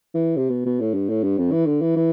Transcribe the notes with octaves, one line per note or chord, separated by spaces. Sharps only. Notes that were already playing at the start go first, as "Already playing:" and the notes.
E3
C3
B2
B2
A2
G2
A2
G2
F2
E3
D3
E3
E3